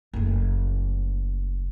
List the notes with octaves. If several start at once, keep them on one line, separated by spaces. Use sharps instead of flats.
F#1 A3